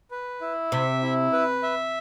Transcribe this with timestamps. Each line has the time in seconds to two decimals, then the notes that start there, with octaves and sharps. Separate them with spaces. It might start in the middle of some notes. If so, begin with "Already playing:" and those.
0.11 B4
0.41 E4
0.72 C3 E5
1.02 E4
1.33 B4
1.63 E5